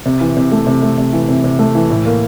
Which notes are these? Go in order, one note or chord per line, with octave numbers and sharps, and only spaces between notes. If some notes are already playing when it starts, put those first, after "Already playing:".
C3
E3
C3
A3
C3
A3
C3
E3
C3
C3
A3
E3
A2
A#3